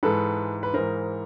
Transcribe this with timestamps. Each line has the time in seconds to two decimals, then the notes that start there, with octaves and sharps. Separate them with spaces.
0.03 G#2 E3 G#3 A4 B4
0.63 B4
0.74 G#2 E3 G#3 A#4 C5